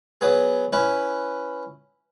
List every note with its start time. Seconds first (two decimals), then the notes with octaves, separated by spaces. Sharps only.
0.21 F#3 B3 G#4
0.72 C#4 E4 B4